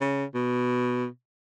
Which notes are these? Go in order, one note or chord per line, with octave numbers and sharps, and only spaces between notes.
C#3
B2